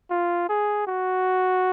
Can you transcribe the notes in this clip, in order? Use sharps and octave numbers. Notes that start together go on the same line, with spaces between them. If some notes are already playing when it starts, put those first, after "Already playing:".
F4
G#4
F#4